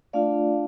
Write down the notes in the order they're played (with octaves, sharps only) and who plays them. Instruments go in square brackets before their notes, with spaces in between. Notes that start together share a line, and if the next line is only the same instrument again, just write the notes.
[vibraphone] A3 D4 F4 D5 F5